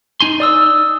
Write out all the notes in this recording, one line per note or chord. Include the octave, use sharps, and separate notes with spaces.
D#4 G#5 C6
D5 D#6 E6